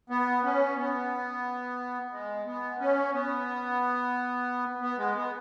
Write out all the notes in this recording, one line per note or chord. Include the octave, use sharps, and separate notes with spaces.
B3
C#4
B3
G#3
B3
C#4
B3
B3
G#3
B3